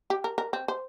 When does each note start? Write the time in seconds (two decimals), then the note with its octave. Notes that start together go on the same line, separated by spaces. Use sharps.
0.10 G4
0.24 A#4
0.38 A#4
0.53 C4
0.68 C5